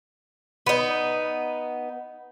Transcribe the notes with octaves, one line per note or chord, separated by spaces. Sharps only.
B3 D#4